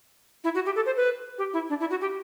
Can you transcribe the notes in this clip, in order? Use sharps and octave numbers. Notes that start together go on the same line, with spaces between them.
E4
F#4
G4
A4
C5
B4
G4
E4
D4
E4
F#4
G4